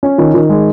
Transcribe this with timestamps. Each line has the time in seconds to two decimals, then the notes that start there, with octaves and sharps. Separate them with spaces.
0.03 C#4
0.18 D#3
0.34 D#3
0.49 G#3